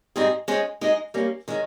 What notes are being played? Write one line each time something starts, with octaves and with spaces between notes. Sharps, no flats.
G#2 G3 C4 D#4 G#4
G#3 C#4 G#4 C5
G#3 D#4 G#4 D#5
G3 A#3 C#4
D#3 G#3 C#4